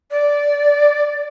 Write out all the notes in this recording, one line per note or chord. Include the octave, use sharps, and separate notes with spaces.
D5